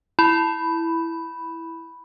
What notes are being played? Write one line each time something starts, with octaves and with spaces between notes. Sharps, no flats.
E4 B5